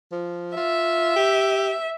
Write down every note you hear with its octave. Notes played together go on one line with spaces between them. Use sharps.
F3
F4 E5
G4